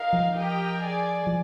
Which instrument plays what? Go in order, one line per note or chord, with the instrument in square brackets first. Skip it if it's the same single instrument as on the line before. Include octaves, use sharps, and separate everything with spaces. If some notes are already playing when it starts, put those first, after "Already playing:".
Already playing: [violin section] D#4 A#4 F5
[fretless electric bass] F3
[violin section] G4 A#4 D#5 G5
G#4 D5 G#5
[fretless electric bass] F3